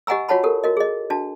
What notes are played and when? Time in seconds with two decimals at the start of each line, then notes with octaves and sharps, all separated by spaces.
0.07 G4 D#5 F#5 G#5 A#5 E6
0.28 F4 F#4 C#5 F#5 A5 B5
0.43 G4 A4 A#4
0.64 F#4 A#4 D#5
0.77 G#4 D#5
1.10 D4 F#4 A5